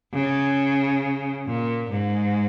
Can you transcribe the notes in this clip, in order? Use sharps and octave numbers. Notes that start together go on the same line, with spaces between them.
C#3
A#2
G#2